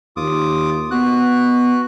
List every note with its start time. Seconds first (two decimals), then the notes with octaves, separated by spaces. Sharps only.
0.17 D#2 F4 D6 D#6
0.91 B3 F#4 F#6